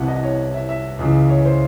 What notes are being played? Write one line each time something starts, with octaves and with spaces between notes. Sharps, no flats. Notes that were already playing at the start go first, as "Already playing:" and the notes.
Already playing: C2 C3 E3 F#5 A5
D#5
C#5
E5
E5
C#2 C#3 E3
C#5
C5